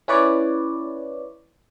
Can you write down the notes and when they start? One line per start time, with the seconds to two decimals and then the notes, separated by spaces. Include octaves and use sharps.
0.08 C#4 E4 B4 C#5 D5